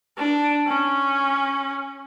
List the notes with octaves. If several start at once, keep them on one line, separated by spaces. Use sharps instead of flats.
D4
C#4